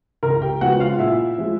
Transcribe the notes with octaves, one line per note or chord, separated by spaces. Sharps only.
C#2 A#4 A#5
G4 G5
C#3 F3 G#3 B3 F#4 F#5
F4 F5
A#2 E4 E5
F3 G#3